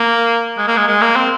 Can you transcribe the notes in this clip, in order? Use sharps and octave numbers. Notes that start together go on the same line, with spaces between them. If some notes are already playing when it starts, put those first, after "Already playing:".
Already playing: A#3
G#3
A#3
G#3
G#3
A#3
C4